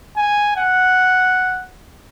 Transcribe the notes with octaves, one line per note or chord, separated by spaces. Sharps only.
G#5
F#5